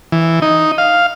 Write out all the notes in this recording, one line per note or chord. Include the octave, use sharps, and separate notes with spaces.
E3
D#4
F5